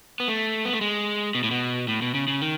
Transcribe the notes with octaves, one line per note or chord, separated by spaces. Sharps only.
B3
A3
B3
A3
G#3
B2
A2
B2
A2
B2
C#3
C#3
D#3